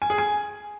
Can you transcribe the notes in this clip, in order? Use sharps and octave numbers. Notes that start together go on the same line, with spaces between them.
G#5
G#4
G#5